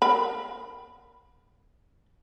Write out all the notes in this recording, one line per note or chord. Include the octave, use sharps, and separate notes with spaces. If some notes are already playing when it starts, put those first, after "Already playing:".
A#4 B5